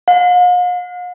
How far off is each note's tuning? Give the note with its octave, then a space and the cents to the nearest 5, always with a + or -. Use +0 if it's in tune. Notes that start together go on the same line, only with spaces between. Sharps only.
F5 +45